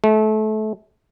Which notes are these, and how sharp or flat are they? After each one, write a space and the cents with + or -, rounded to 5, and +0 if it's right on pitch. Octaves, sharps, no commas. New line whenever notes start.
A3 -30